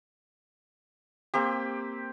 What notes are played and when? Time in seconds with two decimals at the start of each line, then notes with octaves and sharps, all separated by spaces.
1.34 A#3 C4 G4